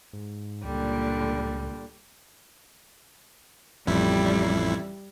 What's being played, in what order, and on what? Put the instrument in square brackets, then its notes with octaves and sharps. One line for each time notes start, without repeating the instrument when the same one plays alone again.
[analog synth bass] G#2
[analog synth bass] C#2 [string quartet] A#2 D3 G3
[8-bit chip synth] A1 F2 E4 [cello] G3